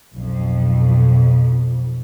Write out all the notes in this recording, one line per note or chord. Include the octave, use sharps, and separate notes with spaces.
B1 F2